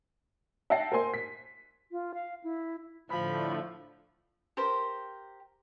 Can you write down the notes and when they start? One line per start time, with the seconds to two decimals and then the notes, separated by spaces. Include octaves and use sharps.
0.70 E5 F#5 G5 A5 A#6 C7
0.92 A#4 C5 G#5 C6
1.14 B6
1.92 F4
2.14 F5
2.44 E4
3.10 A2 D3 F3 A3 B5
4.57 G4 A#4 C5 G5